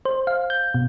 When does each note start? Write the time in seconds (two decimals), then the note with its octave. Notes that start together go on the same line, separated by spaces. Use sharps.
0.05 C5
0.27 F5
0.50 G6
0.74 B2